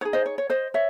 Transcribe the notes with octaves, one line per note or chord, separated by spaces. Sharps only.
D#4 G#4 C#5
C5 D#5
C#5
C#5
C5 D#5
C#5 E5